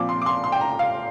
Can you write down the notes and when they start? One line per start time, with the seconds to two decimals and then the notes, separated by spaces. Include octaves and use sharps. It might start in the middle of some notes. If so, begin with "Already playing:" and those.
Already playing: A#2 F3 C4 D6
0.09 C6
0.22 D6
0.26 C6
0.44 C6
0.52 G5
0.61 A#5
0.79 F5